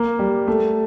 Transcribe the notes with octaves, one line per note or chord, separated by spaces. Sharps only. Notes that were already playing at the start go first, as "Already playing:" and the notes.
Already playing: A#3
G3
A3